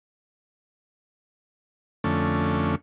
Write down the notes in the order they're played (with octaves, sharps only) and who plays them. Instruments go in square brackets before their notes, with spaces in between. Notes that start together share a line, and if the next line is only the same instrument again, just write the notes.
[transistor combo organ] F2 D3 A3 C#4